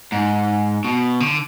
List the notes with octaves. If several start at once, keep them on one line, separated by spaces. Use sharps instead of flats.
G#2
B2
D3